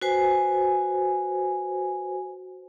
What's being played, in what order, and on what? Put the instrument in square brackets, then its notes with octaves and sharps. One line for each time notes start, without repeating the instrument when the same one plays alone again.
[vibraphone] F#4 B4 C5 G#5